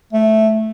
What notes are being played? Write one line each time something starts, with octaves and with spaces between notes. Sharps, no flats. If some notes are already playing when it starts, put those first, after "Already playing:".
A3